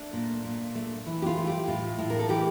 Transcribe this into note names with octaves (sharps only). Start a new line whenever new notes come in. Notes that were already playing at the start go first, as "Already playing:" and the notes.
Already playing: A3 D4
A#2
A#2
A3
E3
G4
F4
A3
G4
A2 F4
A2
A#4
A4
E3 G4